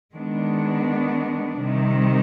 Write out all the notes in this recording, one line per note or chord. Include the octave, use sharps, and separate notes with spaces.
D#3 G#3 B3 D4
C3 D#3 G3